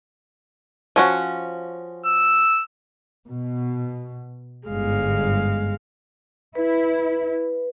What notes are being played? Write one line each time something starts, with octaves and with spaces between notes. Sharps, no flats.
F3 C#4 F#4
E6
B2
G1 G#2 G#3 F5
E4 B4